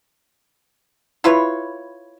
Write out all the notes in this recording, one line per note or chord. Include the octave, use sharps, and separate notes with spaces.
E4 F4 B4 C#5